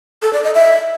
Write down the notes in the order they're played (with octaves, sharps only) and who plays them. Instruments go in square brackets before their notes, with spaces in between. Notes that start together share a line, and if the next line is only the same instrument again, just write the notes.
[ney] A4
D5
D#5
E5